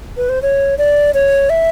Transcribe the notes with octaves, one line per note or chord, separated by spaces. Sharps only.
B4
C5
C#5
D5
C#5
E5